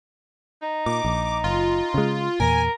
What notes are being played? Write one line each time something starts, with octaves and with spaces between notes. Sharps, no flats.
D#4
A#2 D6
A#1
F#1 F4
C#3 G#3
E2 A#2 A#4 G#5